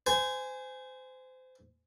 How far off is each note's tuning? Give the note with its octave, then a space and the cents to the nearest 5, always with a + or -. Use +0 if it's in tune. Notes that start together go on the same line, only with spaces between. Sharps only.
C5 -30 G#5 +0